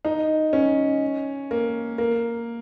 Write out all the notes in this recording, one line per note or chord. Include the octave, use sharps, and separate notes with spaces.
D#4
C#4
A#3
A#3